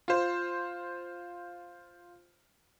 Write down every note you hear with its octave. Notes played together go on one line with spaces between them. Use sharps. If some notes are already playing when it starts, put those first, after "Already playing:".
F4 C5